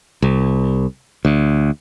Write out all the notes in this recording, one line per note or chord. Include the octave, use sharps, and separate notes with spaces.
C2
D2